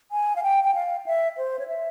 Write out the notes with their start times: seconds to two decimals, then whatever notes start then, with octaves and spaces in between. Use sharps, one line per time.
0.11 G#5
0.36 F5
0.43 G5
0.64 G5
0.75 F5
1.06 E5
1.38 C5
1.59 C#5
1.68 E5